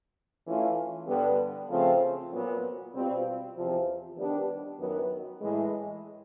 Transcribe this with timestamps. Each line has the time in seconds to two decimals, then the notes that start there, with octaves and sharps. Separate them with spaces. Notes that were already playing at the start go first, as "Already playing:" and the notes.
0.45 E3 A3 C#4 F4
1.07 G2 D3 G3 B3
1.69 C#3 F3 A3 C4 F4
2.31 A#2 F#3 B3
2.92 B2 G3 C4 F4
3.54 E2 C3 F3
4.16 D#3 G3 B3 D4 G4
4.78 F#2 D#3 F#3 B3
5.40 A2 E3 G#3